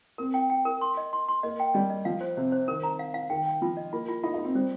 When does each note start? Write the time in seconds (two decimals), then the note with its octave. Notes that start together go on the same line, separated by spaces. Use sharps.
0.18 C4 A#4
0.34 G5
0.50 G5
0.65 A#4
0.81 C6
0.97 D#5
1.13 C6
1.29 C6
1.43 A#3 D#5
1.60 G5
1.74 G3 D#5
1.90 D#5
2.05 F3 F5
2.21 C5
2.37 C3 C5
2.52 C5
2.68 D#3 A#4
2.83 A#5
2.99 F5
3.14 F5
3.30 D#3 G5
3.46 G5
3.62 F3 F4
3.77 D#5
3.93 A#3 F4
4.09 F4
4.23 D#4 F4
4.34 D#4
4.39 F4
4.44 C4
4.55 G3 C5